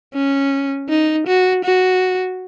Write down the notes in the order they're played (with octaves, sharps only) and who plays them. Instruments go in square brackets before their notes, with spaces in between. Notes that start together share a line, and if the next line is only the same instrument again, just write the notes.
[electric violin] C#4
D#4
F#4
F#4